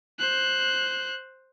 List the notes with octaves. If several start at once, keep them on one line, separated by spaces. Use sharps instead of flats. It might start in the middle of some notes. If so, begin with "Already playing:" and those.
C5 F#6